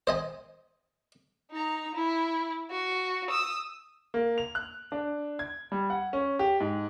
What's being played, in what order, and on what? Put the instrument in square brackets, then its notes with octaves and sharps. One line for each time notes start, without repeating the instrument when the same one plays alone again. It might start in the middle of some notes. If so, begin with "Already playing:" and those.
[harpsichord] C5 D#5 G#5
[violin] D#4 A#5
E4
F#4
D#6 E6
[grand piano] A#3
F7
F#6
D4
G#6
G3
F#5
C#4
G4
G#2